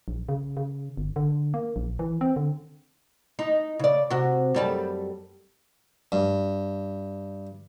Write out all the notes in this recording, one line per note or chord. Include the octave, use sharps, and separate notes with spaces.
A#1
C#3
C#3
G1
D3
A#3
A#1
E3
C4
D3
D#4
C#3 D5
C3 F#4
F#2 G3 A4
G2